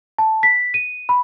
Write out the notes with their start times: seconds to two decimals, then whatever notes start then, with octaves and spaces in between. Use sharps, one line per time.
0.18 A5
0.43 B6
0.74 D#7
1.09 B5